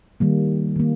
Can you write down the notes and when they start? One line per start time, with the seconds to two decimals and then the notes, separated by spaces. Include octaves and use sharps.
0.20 D#3 G3 A#3
0.76 D#3 A#3